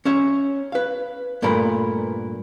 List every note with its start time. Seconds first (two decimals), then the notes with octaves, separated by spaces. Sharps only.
0.05 C#4 C#5 E5
0.72 B4 F5
1.42 G2 A#2 A3 B3 A#4 B5